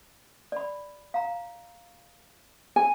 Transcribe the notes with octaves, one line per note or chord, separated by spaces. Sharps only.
D5 B5
F5 A#5
G#5